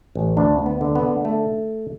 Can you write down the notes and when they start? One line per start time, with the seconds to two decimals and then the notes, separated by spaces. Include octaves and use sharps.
0.15 A1
0.37 D2 D4
0.59 D2
0.66 B3
0.81 D3
0.95 B3
1.03 D3
1.25 A3